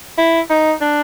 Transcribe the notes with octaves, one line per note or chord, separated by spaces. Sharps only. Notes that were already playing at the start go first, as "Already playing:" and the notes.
E4
D#4
D4